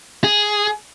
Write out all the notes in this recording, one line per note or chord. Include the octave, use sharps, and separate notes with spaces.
G#4